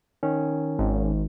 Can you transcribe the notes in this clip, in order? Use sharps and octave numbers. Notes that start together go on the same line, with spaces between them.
D#3 C#4
G#1